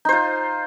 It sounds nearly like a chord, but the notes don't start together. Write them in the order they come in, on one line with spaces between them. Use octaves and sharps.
D#4 C5 F4